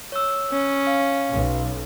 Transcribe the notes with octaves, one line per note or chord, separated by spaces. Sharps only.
C#5 E6
C#4
F5
B1